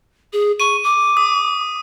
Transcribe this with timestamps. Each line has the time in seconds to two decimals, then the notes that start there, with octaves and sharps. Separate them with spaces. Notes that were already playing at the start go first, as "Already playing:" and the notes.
0.33 G#4
0.60 C#6 D#7
0.84 D6
1.17 D#6